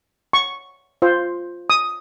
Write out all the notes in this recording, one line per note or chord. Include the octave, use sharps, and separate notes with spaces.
C#6
F4 C5
D#6